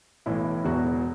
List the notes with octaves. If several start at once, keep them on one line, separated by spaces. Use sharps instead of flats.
B1 A2 E3 E4
E1 E2 B2 F#4